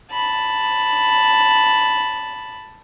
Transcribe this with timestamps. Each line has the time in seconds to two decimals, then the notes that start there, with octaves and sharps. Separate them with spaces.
0.12 A5 B5